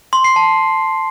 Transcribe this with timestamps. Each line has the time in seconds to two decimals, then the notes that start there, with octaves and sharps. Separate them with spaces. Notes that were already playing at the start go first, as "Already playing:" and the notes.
0.13 C6
0.24 C7
0.36 A5